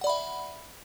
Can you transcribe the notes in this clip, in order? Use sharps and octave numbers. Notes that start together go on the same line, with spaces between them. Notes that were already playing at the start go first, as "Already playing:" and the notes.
D5 E5 F#5 B5